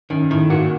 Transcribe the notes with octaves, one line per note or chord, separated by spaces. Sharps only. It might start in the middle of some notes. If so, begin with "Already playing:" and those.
F#2 D#3
A2 D#3
A#2 F#4